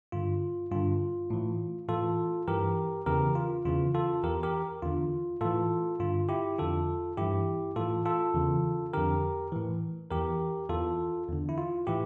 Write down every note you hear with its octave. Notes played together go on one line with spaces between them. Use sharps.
G2 D3 F4
G2 D3 F4
A2 E3
A2 E3 F4 A4
G2 E3 G4 A#4
E2 C#3 E3 G4 A#4
F4
E2 C#3 E3 F4
F4 A4
E2 E3 G4 A#4
G4 A#4
E2 D3 F4
A2 E3 F4 A4
G2 D3 F4
E4 G4
F2 D3 F4 A4
G2 E3 E4 G4
A2 E3 F4 A4
F4 A4
E2 C#3 E3
F2 D3 G4 A#4
A2 E3
E2 E3 G4 A#4
E2 E3 F4 A4
E2 D3
E4
F4
A2 E3 E4 G4